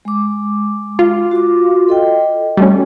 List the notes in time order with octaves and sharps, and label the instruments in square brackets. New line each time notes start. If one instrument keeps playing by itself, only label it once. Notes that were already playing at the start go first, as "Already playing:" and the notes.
[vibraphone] G#3 D6
[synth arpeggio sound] F4
[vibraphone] F#4 D6
A4 D#5 G5
[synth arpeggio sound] G3 A3 C#4 [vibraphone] F#4